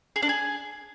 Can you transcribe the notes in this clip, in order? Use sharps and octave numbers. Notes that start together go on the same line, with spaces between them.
G#4
D4
G#4